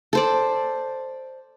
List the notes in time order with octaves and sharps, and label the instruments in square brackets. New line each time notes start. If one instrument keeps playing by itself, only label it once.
[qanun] A4 C5 D5